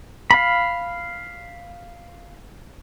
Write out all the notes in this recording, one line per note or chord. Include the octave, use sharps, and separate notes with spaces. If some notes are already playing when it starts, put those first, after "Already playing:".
F5 B5